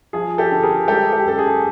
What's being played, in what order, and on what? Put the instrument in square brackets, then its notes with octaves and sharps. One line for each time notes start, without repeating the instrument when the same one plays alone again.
[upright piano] F3 G#4
G4 A4
D3
G#4 A#4
G#3 G4 A4
G4
F#2 A4
G#4